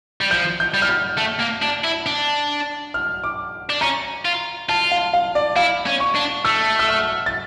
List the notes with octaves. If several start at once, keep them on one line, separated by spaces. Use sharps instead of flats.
G3
F3 G6
G6
G3
F6
G6
A3
A#3
D4
E4
D4
F6
D6
D4
C#4 A#5
F4
F4 A5
F5
F5
D5
E4 F5
C#4
C#6
D4
A3 E6
E6
F6
A6